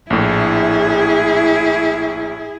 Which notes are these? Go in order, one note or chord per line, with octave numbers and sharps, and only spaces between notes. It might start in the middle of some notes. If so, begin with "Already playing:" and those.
A#1 A2 E4 G#4